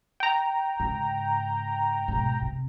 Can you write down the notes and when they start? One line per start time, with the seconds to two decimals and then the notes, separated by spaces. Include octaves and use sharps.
0.20 G5 A#5
0.80 G#2 C#3
2.08 G#2 B2
2.42 C3